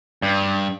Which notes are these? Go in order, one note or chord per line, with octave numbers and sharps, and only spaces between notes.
G2